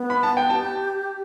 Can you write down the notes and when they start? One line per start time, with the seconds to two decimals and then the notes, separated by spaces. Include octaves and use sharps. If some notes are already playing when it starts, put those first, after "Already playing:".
Already playing: B3
0.10 B5
0.23 A5
0.37 G5
0.50 G4 A5